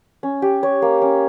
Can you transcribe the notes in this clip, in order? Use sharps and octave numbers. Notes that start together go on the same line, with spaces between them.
C#4
G4
C#5
A#3
C#4